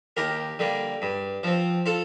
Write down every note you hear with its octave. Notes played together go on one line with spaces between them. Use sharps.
D#2 G4 A#4
D3 G3 A#3
G2
F3 C4
F4 A4